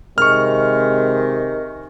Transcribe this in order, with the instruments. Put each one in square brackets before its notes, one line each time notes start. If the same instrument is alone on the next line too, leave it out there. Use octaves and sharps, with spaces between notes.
[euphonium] C3 [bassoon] D#3 [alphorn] G#3 [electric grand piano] C#6 F6